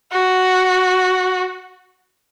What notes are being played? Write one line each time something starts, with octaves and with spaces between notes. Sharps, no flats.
F#4